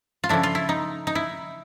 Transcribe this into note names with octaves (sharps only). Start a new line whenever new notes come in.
F4
C#3 F3 A3 D4 E4
F4
E4
D#4
D#4
E4